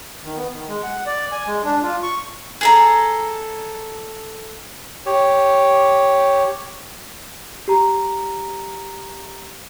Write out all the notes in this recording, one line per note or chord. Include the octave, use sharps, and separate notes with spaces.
D#3
B3
D#3
G#3
F#5
D5
G#5
G#3
D4
F4
C#6
G#4 A4 A#5
G4 C#5
G4 A#5